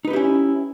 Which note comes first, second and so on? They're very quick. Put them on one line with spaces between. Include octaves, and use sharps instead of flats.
D#4 B4 G4 E4 C#4